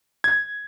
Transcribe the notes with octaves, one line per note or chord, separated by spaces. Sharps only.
G#6